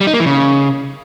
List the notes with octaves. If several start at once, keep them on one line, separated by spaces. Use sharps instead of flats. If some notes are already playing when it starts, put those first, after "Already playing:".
G3
D#4
A#3
E3
C#3